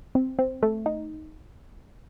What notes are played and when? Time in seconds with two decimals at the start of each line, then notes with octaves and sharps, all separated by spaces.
0.15 C4
0.39 C4
0.63 A3
0.86 D#4